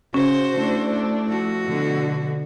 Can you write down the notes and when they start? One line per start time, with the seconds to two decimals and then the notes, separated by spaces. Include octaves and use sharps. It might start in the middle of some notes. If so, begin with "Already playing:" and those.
0.14 C#3 C#4 F#4 C5
0.56 A3 D4 E4
1.26 F3 F#4
1.67 B2 D3